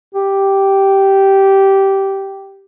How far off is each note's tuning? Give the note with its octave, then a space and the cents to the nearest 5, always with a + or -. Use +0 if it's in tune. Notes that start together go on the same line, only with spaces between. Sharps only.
G4 -10